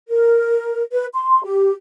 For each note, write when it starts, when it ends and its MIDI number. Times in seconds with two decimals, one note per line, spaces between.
0.09 0.81 70
0.92 1.05 71
1.14 1.41 84
1.44 1.71 67